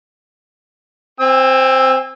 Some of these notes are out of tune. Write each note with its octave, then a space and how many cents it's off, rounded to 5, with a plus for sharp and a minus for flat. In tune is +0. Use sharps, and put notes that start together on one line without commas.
C4 +0 G#5 -35 E6 +0